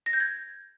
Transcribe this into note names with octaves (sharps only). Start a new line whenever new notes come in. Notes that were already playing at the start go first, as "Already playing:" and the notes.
A#6
G6
G#6